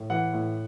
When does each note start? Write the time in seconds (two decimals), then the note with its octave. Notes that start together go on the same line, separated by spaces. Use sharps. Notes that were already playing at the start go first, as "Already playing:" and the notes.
Already playing: A2
0.10 E3 F#5
0.33 A2